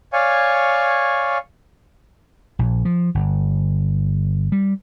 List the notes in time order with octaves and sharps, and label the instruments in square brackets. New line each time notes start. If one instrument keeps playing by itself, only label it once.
[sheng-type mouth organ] C#5 D5 F5 G#5 C#6
[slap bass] A#1
F3
G1
G3